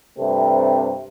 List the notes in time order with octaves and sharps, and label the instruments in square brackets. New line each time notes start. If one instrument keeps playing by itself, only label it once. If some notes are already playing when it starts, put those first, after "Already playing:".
[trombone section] G2 C3 A3 C4